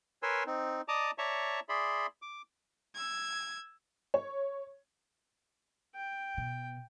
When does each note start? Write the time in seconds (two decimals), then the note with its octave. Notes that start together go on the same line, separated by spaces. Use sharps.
0.23 A#4 B4 C#5 G#5 C6 E6
0.47 C4 D#4
0.88 D5 D#5 A5 A#5 D6 D#6
1.18 C#5 D5 E5 A5 A#5 C#6
1.69 G#4 D5 E5 B5 C6
2.22 D6
2.95 E6 G#6
4.14 C#5
5.95 G5
6.37 B2